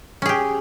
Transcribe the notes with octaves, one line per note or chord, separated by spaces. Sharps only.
C#4 G4 G#4